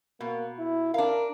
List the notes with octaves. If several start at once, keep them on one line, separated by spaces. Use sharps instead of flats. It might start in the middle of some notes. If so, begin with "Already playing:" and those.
B2 A#3
E4
D4 A#4 F5